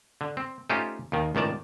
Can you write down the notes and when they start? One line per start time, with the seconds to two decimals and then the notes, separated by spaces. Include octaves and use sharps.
0.21 D3
0.37 C4
0.70 A3 C#4 D#4 F4 G4 C5
1.12 D#2 D#3
1.35 C#2 A2 D#3 D5 A5